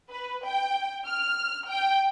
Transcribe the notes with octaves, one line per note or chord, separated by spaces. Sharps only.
B4
G5
F6
G5